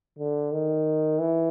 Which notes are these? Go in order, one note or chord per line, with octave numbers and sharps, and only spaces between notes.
D3
D#3
E3